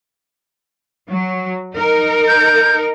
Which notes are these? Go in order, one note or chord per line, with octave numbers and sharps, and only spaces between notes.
F#3
D#4 A#4
G6